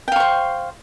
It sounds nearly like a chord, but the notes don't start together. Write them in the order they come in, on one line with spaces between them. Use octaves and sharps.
G5 F5 C#6 C5